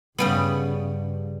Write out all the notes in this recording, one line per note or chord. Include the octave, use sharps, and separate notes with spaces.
G2 C#3 G3 B3